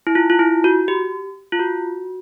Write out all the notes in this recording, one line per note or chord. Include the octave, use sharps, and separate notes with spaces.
E4
F4
F4
E4
F#4
G4
F4
F#4